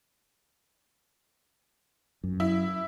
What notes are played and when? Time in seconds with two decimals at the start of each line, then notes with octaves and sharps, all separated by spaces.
2.24 F#2
2.40 E4